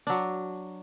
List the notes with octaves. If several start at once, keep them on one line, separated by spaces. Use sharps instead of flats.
F#3 D4